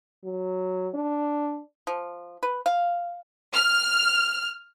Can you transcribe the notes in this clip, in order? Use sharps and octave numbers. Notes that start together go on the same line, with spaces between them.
F#3
D4
F3
B4
F5
F6